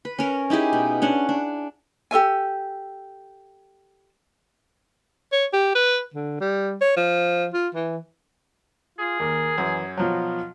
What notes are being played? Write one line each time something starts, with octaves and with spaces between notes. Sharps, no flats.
B4
C#4 A#4
D#4 E4 G4 G#4
B2
C#4 D4 F#5
D4
G4 A4 E5 G#5
C#5
G4
B4
D3
G3
C#5
F3
F4
E3
F4 G#4
D#2 A#4
F#2 E3
B2 F3 F#3 F4